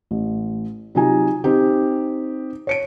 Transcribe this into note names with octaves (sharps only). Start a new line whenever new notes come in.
A1
C3 F#3 D#4 F4 G#5 A#5
C4 D#4 G4
C#5 C#7 D7